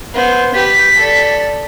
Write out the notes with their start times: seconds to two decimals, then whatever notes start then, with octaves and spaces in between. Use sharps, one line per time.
0.14 B3 C5
0.54 G4 B4 B6
0.96 A4 D5